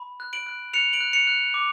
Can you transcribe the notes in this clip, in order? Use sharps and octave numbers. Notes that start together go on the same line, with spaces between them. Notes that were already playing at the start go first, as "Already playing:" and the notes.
Already playing: B5
F#6
D7 F#7
F#6
F#6 C#7 F7
D7 F#7
F#6
C#7 F7
F#6
D6